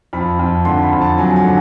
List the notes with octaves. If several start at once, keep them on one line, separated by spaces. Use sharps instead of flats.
F2 B5
F2
D3 C6
B5
F2
A5
F#3 G#5
G#5
D3